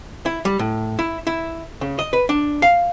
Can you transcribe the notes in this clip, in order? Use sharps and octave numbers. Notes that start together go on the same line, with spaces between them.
E4
G3
A2
E4
E4
C#3
D#5
B4
D4
F5